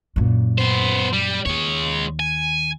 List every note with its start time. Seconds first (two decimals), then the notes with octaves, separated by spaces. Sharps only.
0.16 F#2 A#2
0.58 B3 C5
1.13 G3
1.46 D#2 G#3 C#5
2.20 G#5